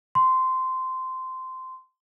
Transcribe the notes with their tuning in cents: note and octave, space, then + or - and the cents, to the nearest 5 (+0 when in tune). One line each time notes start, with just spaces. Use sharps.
C6 -15